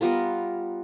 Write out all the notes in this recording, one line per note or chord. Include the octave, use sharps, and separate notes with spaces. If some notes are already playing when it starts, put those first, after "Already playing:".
G3 B3 F4 A#4